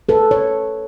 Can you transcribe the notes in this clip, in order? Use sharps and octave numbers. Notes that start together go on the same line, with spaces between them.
A4 B4
C#5